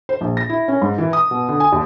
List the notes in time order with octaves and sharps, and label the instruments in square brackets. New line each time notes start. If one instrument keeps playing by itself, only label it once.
[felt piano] C5
A#1
A#6
E4
C#4
G#2
E3
D#6
B2
D3
G#5
D#2